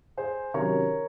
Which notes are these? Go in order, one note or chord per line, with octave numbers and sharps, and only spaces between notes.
G#4 C5
C3 D#3 F#3 C#4 A#4 C#5